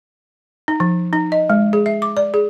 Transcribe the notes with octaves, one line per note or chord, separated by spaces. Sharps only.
D#4
F3
D#4
D#5
G#3
G#4
E5
D6
D5
G#4